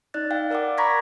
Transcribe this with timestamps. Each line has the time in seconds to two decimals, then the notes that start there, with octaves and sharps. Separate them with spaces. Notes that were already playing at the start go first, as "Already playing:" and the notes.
0.14 D#4 D5 F#6 A6
0.31 F5 G5
0.50 A#4 D5 F5 F#5 D6
0.78 A#5 B5 C#6 G#6 A#6 B6